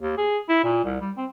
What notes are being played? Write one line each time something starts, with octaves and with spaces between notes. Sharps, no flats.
D#2
G#4
E4
A#2
C2
G3
C4